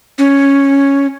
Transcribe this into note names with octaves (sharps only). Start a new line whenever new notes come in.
C#4